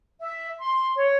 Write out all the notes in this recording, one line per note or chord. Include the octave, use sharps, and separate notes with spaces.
E5
C6
C#5